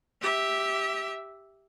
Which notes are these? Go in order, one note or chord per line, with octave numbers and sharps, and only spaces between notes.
G4 E5